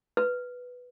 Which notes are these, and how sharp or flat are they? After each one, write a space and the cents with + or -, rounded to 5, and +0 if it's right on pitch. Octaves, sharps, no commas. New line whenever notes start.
B4 +0